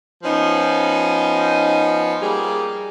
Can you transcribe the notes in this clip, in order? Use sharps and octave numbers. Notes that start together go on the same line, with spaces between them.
F3 B3 C#4 D#4
G3 A#3 G#4